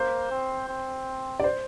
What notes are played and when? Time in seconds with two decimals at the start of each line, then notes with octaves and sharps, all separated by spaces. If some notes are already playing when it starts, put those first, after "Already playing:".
Already playing: A#3 C5
0.31 C4
0.69 C4
1.40 D5
1.44 C5